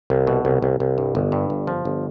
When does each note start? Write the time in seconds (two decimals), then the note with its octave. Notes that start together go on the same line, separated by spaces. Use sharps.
0.10 C2
0.27 B2
0.45 C2
0.62 C2
0.80 C2
0.98 G2
1.15 G1
1.32 G2
1.50 G1
1.67 F3
1.85 G1